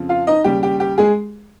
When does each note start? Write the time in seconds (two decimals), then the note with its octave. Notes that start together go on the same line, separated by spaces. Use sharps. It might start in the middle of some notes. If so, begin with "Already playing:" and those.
Already playing: F2 C#3 F3
0.09 F4 F5
0.27 D#4 D#5
0.44 D#2 C#3 G3 G4
0.63 G4
0.80 G4
0.98 G#3 G#4